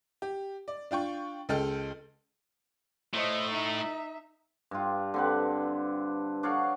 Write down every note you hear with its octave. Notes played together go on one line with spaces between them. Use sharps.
G4
D5
D4 F4 G5 C#6
C#2 G#3 A4 G5 F6
A2 A3 C5 D#5
D#4 E5
G2 F4
D3 C4 B4
D4 C#5 F5 F#5